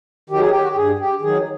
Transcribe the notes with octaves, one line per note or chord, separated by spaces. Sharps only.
D#3 F#3 G4
G#4
G4
F#4
G4
G2 G#4
G4
D#3 F#3 G#4